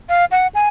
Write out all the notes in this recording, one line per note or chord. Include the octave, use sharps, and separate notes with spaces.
F5
F#5
G#5